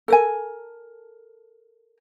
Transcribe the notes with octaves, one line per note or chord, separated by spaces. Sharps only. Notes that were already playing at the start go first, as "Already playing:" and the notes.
A4 A#4 G#5